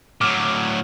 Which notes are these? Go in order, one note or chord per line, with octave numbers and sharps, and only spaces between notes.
A2 F#3 D6 F6